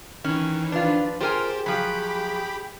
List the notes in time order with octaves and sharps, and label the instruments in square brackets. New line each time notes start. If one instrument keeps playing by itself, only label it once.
[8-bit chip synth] D#3 E3 [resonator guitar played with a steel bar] C#4
[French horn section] F3 B4 [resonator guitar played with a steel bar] D4 F4
[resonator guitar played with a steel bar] F4 A#4 G#5 [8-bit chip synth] G4 C5 [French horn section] G#4
[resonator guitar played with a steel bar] F3 F#3 [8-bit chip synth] G4 G5 B5